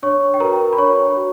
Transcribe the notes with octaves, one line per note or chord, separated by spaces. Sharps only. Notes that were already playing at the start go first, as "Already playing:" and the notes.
D4 C#5 C#6
G5
F#4 A#4 B4 A#5
B5
D4 C#5 C#6
F#4